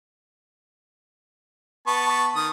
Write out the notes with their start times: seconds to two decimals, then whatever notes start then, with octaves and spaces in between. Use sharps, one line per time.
1.87 B3 A5 C#6
2.35 D#3 D#6